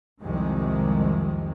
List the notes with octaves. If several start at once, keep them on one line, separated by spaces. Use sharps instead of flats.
C2 F2 D#3 G#3